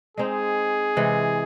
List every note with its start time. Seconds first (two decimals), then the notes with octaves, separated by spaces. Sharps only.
0.17 G#3 C4 D#4 G#4
0.96 C3 E3 G#3